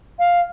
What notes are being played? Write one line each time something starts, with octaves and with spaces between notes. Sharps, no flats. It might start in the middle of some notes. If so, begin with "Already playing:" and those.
F5